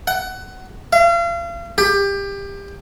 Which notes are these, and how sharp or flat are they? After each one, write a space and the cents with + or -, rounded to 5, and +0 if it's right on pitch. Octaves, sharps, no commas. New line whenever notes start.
F#5 +20
F5 -40
G4 +25